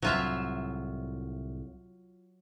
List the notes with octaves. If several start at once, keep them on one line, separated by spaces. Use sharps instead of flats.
C2 A2 F#3 F4 E5